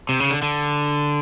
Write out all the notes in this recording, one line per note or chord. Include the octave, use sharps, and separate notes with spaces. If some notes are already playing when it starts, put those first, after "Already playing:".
C3
C#3
D3
D3